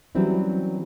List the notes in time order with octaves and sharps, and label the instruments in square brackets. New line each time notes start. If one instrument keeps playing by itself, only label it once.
[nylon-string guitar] E3 F#3 G3 C4 C#4 E4